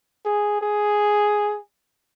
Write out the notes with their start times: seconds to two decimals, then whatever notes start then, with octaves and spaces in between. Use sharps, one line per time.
0.26 G#4
0.61 G#4